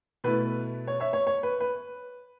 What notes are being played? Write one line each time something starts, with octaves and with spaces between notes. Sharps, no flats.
B2 A3 E4 B4
C#5
C#5 E5
C#5
C#5
B4
B4